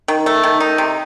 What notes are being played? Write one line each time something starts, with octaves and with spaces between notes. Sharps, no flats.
D#3
A3
D#3
D#4
C3